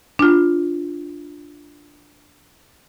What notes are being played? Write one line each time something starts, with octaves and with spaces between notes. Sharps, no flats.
D4 F4